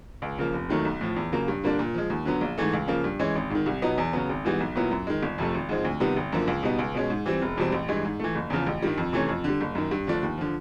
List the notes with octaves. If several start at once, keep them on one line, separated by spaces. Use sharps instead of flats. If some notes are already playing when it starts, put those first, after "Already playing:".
C#2
C#3 F3 A#3
F1
D#2 D#3 F#3 A3
B1
A2 F3
E2
C#3 F#3 A#3
G2
D3 G3 A#3 D4
A#2
F3 G#3
D#2
D3 F#3 B3
A#1
G#2 E3 A3
C#2
C#3 F3 A#3
G2
E3 G#3 C#4
G#1
G#2 D#3
C2
B2 F#3 B3 D#4
E2
C#3 F#3 B3
G#1
G#2 E3 G3 B3
B1
A#2 F#3 B3 E4
F#2
D#3 G#3
G1
F2 C3 F3 A3
G#1
G#2 F3 G#3 C4
D2
C3 D#3 G3 B3
G#1
F#2 D3 F3 A#3
C#2
B2 G3 B3 D#4
C#2
B2 G#3 C#4
G#2
E3 G3 C4
E1
E2 B2 G3 C4
A1
G2 E3 G#3
G#2
E3 A3
F#1
E2 C#3 F3
A1
G2 D#3 G3
F2
C3 E3 A3 C#4
F2
D3 G3
F#1
F#2 D#3
G2
D3 F3 A3 D4
D#2
D3 F3